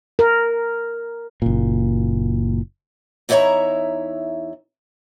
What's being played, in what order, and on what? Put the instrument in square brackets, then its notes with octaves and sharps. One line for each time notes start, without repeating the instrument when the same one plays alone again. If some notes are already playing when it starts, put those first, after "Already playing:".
[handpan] A#4
[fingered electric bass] F#1 A#2
[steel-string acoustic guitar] E2 D#4 E4 C#5 E5 A#5